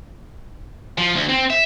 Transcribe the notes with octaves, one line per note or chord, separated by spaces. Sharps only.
F3
D2
C4
E5